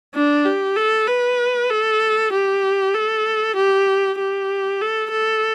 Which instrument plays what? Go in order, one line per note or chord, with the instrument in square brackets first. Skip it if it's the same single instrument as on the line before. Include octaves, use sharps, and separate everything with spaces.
[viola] D4
G4
A4
B4
A4
G4
A4
G4
G4
A4
A4